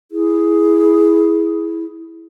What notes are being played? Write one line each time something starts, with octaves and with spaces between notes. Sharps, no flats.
E4 G#4